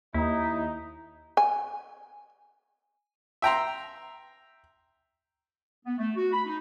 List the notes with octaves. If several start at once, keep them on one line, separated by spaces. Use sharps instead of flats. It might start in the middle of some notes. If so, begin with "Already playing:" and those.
D#2 D#4 E4
G#5
E5 G5 A#5 C6
B3
A3
F#4
B5
D#4